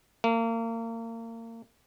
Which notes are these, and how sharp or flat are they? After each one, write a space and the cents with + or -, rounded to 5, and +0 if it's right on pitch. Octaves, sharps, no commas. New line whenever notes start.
A#3 -30